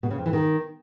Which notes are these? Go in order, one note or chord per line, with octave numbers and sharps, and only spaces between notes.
B2
C#3
F2
E3
D#3